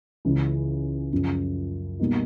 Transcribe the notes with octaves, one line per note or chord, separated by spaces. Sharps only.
C#2 C#3 E3
F#2 C#3 F3
B2 G3 A#3 D#4